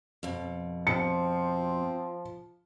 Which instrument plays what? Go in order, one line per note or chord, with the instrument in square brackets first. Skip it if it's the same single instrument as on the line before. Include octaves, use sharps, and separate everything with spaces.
[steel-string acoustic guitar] F2 B2
[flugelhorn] F3 [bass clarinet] C4 [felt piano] C#7